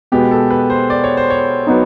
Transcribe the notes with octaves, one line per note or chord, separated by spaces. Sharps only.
B2 G#3 B3 G4
A4
B4
C5
D5
C#5
C5
C#5
F#3 B3 D#4